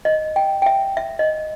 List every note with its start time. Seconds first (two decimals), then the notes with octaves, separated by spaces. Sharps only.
0.05 D#5
0.36 G5
0.62 G5
0.66 E5
0.97 E5
1.19 D#5